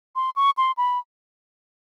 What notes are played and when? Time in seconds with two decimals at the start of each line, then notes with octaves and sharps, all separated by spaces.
0.16 C6
0.36 C#6
0.57 C6
0.77 B5